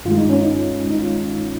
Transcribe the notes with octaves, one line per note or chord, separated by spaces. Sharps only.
G2 D#3 G#3 F4
D#4
C#4
D#4
D#4
F4